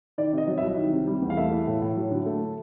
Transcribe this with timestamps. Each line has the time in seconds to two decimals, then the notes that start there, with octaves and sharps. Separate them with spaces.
0.18 D#3 D5
0.33 C3 D#5
0.48 F#3
0.58 E5
0.63 C2
0.77 D#3
0.92 C3
1.07 G3
1.22 E2
1.30 F5
1.37 A3 E5
1.51 E3
1.67 A2
1.82 A2
1.96 F#3
2.11 D3
2.26 A3